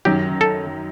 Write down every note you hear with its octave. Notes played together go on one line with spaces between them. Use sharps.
F#2 D#3 F#3 G4
A4